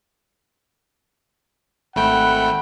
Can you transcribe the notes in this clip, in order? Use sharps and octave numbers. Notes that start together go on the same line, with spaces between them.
G#1 A3 F#5 G5 B5